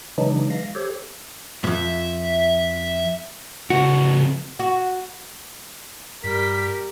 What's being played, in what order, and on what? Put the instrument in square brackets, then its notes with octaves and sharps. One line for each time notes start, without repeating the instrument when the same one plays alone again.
[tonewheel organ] C#3 E3 F#3 G#3 D4 D#4
E3 G#3 F5 A#6
G4 A4 C5 C#5
[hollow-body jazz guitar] F2 G#2 [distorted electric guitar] E5
[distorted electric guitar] C#3 A3 [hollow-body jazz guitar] F#4
[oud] F#4
[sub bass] G2 [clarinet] G3 [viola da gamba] G4 A#4 [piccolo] B6